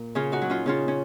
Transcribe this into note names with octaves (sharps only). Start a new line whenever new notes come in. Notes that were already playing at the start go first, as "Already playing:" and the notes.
Already playing: A#2
C#3 C#4 F4
D#4 F#4
F#3
C#4 F4
C#3 C#4 F4
C#4